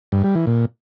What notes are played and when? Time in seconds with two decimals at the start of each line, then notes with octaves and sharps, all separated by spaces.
0.12 G2
0.24 G3
0.35 E3
0.47 A#2